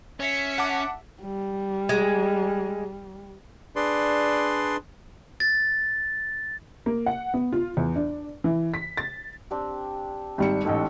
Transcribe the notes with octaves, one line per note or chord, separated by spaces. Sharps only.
C#4 E5 B6 C#7
F#5 A5 D6
G3
G#3
D4 G#4 B4 D5 C6
A6
A#3
F#5
B3
F4
E2
D4
E3
B6
A6
C4 D4 G4
G#1 G3 G4 E6 C#7
A1 G#2 A4 G5